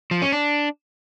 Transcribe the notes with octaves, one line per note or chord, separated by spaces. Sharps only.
F3
C#4
D4